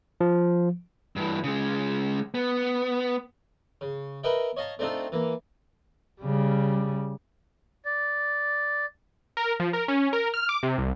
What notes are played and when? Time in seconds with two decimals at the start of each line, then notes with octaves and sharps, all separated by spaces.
0.21 F3
1.16 G2 E3
1.44 C#3 G#3
2.34 B3
3.81 C#3
4.24 A#4 B4 D#5 E5 G5
4.57 C#5 D#5 F5 A5 A#5
4.79 A3 C4 D4 D#4 F4 A4
5.12 E3 A#3
6.21 C#3 G3
7.85 D5
9.37 A#4
9.60 F3
9.73 A#4
9.88 C#4
10.13 A#4
10.34 F6
10.49 D6
10.63 C3
10.78 C2